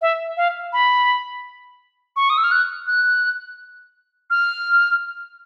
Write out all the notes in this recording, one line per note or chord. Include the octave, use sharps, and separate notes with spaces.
E5
F5
B5
C#6
D#6
E6
F6
F#6
F#6
F6